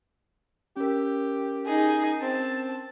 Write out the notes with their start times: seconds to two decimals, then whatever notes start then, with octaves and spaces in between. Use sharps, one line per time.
0.77 C#4 G4 A#4
1.66 D#4 G#4
2.22 C4 A5